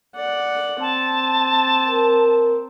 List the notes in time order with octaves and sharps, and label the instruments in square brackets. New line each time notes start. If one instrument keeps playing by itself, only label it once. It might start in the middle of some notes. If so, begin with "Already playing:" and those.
[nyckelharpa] D5 F#5
[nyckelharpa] C4 [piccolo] A5
[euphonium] A#4